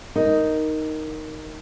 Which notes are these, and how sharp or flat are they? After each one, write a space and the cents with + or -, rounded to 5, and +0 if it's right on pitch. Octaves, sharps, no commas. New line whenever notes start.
D#4 +0 A#4 +0